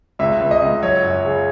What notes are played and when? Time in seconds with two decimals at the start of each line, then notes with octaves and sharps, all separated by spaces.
0.19 C#2 E5
0.41 C#2
0.51 D#5
0.62 C#2
0.83 F#3 C#5
1.04 F#2
1.25 C#3